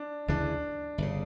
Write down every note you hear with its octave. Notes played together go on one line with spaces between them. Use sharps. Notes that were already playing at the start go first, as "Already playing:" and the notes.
Already playing: D4
D2 C#3 E3 D4
G1 C#3